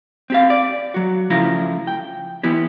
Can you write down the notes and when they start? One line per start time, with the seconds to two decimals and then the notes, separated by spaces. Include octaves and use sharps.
0.30 C4 G4 F5
0.50 D5
0.94 F#3 F#4
1.30 C#3 F3 A3 E4 F5 A#5
1.87 G5
2.43 E3 B3 E4 G4